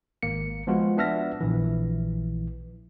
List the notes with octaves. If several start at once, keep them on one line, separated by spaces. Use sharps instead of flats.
G#1 A#3 C#7
F3 G#3 B3 F4 F#4
B3 D4 E5 F6 A#6
A#1 E3